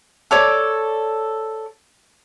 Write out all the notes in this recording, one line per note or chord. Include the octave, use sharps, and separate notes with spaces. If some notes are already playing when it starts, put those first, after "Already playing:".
A4 C#5 D5